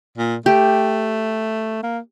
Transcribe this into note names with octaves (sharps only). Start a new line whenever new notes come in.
A#2
A3 G4
A#3